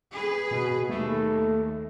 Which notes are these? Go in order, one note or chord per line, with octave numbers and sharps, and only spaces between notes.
G#4 B4
B2
D#2 A3